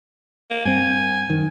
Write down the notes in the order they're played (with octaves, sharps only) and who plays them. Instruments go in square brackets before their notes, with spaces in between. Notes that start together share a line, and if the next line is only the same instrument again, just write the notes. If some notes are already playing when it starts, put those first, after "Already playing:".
[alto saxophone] A#3
[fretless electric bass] G2 C4 [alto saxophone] G#5
[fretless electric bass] F#2 D#3